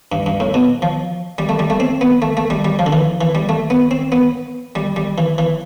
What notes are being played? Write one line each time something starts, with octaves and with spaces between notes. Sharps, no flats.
G2
G2
A2
B2
F3
G3
A3
G3
A3
C4
B3
A3
A3
G3
G3
F3
D3
E3
E3
G3
A3
B3
C4
B3
G3
G3
E3
E3